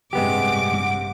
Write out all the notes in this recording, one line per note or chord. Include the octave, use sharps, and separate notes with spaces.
A1 G2 C3 G#3 B3 G4 F#5 D6